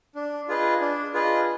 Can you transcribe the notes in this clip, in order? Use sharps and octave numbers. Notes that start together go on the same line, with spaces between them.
D4
F4 G#4 B4 D#5
D4
F4 G#4 B4 D#5